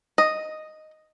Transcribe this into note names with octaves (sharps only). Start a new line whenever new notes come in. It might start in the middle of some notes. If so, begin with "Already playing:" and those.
D#5